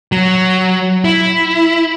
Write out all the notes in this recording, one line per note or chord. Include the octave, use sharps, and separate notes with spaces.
F#3
E4